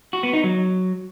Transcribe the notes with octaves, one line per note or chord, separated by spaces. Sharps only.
F#4
B3
D#4
F#3